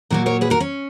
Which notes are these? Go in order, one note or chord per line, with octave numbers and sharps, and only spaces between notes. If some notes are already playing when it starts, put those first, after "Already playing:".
A#2 F#3 A#3 F#4 A#4
A#4 C#5
G#4 B4
F#4 A#4
C#4